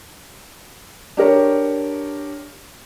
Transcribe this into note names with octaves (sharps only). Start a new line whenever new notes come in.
D4 G4 A#4 C#5